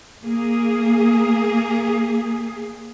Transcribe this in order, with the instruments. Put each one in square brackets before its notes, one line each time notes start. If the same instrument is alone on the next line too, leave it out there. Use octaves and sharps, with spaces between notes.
[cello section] A#3 G#4